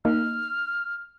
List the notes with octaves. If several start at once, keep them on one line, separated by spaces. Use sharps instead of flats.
A#3 D#4 F6